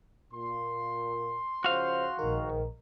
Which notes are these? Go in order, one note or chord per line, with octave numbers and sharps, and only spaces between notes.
A#2 C6
C#3 F3 F#4 C5 F5
A#1 G#2 D#3 A#4